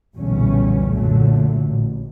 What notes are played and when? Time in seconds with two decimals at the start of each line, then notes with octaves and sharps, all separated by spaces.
0.16 B1 E2 A#2 D3 G3 C#4
0.91 F#2 A#2 D3 F#3 A3
1.59 A1